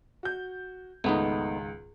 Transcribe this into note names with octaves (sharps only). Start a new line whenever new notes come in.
F#4 G6
C#2 G#2 D#3 A3 B3 D#4